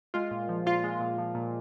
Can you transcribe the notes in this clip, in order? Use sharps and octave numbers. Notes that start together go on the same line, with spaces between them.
G#3 F4
A#2
F3
A#2 F4
G#3
A#2
F3
A#2